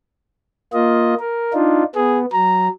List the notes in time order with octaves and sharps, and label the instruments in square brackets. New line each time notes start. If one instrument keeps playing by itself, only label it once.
[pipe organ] A#3 F4 D#5
A#4
D4 D#4 F4
[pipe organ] B3 [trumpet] G#4
[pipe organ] F#3 [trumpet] A#5